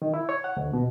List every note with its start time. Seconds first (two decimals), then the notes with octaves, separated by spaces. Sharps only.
0.02 D#3
0.14 E4
0.29 C#5
0.44 F#5
0.57 D2
0.73 B2